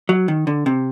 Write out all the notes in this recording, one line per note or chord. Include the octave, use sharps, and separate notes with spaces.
F#3
D#3
D3
C3